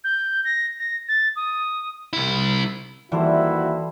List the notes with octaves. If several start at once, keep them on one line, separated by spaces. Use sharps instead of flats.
G6
A#6
A#6
A6
D#6
C2 E4
D#2 E3 G3 E4 F#4 A4 C5